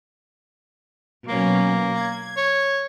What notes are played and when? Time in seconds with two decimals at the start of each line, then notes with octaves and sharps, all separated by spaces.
1.27 B2 F#3 A#3 C#4
1.95 G#6
2.37 C#5